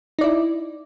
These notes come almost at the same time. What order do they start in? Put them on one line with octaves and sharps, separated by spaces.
D#4 D5 E4